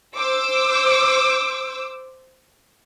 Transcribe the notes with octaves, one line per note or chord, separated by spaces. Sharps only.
C5 D6 E6